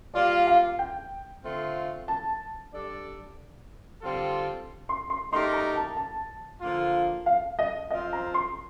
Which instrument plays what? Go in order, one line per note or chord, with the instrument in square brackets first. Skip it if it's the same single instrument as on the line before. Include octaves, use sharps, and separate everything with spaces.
[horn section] G3 A#3 F4 [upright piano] D5
[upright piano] F5
G5
[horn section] D3 A3 C4 F4
[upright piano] A5
[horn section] G3 D4 A4 D5
D3 G3 C4 F4 A4
[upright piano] C6
C6
[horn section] A3 D#4 G4 A#4 D5 [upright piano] C6
[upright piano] A#5
A5
A5
[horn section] D3 F3 A#3 F4
[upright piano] F5
D#5
[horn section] F3 C4 F4 C5 [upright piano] D#5
[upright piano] A#5
C6